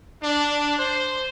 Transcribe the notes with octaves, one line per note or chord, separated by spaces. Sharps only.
D4
C5